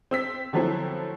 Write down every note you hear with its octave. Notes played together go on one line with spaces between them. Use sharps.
C4 E6 B6
D3 F3 F#3 A3 C4 E4